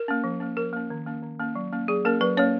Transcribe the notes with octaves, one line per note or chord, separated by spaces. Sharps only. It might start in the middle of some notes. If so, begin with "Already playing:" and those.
Already playing: A#4
A#3 C#4
F3
A#3 C#4
F3 A#4
A#3 C#4
D#3
A#3 C#4
D#3
A#3 C#4
F#3
A#3 C#4
F#3 G#4
A#3 C#4 A#4
F#3 B4
A#3 C#4 C#5